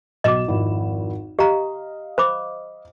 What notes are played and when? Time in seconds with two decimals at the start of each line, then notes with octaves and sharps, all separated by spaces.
0.24 B1 F#4 D#5 D6 E7
0.48 G#1 F2 E4
1.39 G4 D#5 F5 A#5
2.18 C5 B5 D6